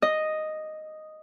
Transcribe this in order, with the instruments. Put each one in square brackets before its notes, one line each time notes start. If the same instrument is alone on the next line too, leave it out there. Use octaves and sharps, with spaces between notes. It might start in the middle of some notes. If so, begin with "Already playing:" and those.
[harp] D#5